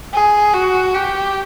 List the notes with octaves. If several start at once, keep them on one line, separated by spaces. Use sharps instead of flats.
G#4
F#4
G4